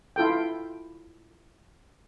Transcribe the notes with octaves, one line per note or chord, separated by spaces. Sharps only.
E4 F4 A4 G5